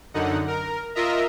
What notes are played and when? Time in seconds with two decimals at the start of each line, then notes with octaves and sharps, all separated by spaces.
0.14 F#2 D3 D#4 F#5
0.47 A#4
0.95 F4 A#4 D#5 E5 A#5